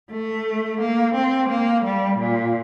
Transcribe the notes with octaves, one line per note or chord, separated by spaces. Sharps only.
A3
A#3
C4
A#3
G3
A#2